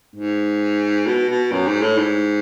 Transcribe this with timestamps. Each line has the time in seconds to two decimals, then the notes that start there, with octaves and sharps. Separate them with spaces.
0.16 G#2
1.07 B2
1.29 B2
1.52 F#2
1.67 G#2
1.82 A2
1.98 G#2